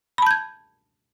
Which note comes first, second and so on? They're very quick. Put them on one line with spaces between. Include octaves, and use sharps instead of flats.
B5 A5 G6 G#6